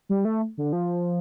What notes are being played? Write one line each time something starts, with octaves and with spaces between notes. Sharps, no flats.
G3
A3
D3
F3